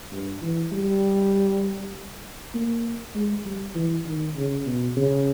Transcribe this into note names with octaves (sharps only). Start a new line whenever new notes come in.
G2
E3
G3
A#3
G#3
G3
E3
D#3
C#3
B2
C#3